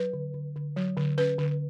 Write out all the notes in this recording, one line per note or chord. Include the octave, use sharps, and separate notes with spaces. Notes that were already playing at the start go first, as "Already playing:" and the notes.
Already playing: F#3 B4
D3
D3
D3
F#3
D3
C#4 B4
D3